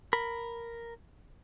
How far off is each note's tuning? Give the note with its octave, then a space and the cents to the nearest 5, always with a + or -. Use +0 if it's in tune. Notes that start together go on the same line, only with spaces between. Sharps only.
A#4 +0 B5 +0